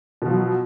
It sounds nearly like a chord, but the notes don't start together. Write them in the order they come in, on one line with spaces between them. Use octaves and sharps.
B2 F3 F#3